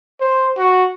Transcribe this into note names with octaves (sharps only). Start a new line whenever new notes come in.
C5
F#4